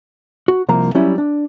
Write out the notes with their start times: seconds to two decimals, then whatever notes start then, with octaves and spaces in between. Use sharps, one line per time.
0.48 F#4
0.69 C2 F3 A#3 A#5
0.95 F#3 G3 C#4 E4
1.18 D4